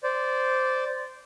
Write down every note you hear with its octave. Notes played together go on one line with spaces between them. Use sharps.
C5 D5